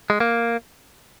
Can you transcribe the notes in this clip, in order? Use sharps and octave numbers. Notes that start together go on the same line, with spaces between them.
G#3
A#3